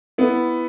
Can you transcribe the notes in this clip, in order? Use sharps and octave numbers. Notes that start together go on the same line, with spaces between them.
B3 E4